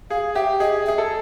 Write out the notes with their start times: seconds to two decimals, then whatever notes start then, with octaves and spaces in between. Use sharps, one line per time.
0.10 G#4 F5
0.35 G4 E5
0.60 G#4 D#5
0.86 G#4 E5
0.98 A4